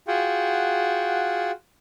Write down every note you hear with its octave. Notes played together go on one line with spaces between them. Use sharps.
F4 F#4 G#4 F#5 G5